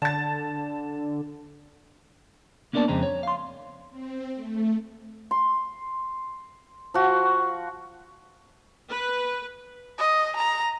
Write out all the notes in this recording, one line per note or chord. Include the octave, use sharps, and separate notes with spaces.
D3 A5 A6
A#3 B3 D4 A#4 D5 A5
F2 C#3 G#3 C4 A#5
C#5
F5 C6
C4
A3
C6
F3 F#4
B4
D#5
A#5